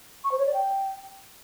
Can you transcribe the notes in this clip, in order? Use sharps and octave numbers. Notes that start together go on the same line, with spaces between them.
C#6
C5
C#5
D5
G5